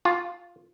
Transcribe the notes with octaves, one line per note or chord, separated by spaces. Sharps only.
F4